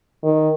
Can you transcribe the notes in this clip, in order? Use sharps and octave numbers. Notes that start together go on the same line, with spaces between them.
D#3